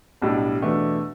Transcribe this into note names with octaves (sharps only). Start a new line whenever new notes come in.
B1 A2 G3 D4
E2 B2 A3 D4